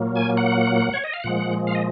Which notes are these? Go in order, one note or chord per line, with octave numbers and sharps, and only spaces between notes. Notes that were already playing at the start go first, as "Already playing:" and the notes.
Already playing: A#2 F#3 A#3
G#5
F#5
C#5
D#5
F5
A#2 F3 G#3 F#5
F5
D#5